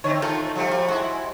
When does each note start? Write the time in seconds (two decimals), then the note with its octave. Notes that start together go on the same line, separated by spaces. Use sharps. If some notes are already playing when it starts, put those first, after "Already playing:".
0.04 D3 C4 C#5
0.22 D#3 G#3 A3 F4 A4
0.55 F3 G3 A3
0.72 F#3
0.88 G#3 E4 F#4